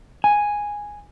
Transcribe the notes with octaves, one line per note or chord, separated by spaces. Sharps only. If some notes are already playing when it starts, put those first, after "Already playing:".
G#5